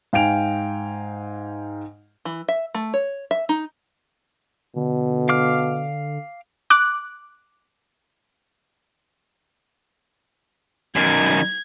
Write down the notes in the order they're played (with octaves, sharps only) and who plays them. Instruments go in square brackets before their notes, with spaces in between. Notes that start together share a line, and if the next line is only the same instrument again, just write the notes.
[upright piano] G#2 F5 G5 G#5 D7 F7
[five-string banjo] E3
E5
A3
C#5
E5
D#4
[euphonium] B2 [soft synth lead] D3
[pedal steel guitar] F5 D6 F6
[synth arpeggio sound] D6 F#6
[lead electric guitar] F#2 D#3 [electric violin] G#6